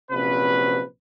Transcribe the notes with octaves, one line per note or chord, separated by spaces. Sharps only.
A#1 C3 F3 F#3 C#4 B4